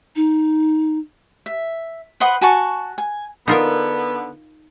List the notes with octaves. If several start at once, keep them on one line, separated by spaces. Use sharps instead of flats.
D#4
E5
B4 C5 F#5 D#6
F#4 G#5 A5 C#6
G#5
D3 B3 D#4 F4 A#4